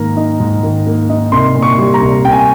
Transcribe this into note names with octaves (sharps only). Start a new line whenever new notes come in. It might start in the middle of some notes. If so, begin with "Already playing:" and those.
Already playing: G#2 D#3 A#3 A#5
D#4
G#2
D#3
A#3
D#4
C2 C6
A#2
C#6
G3
A#5
C2
C2 G5
G#5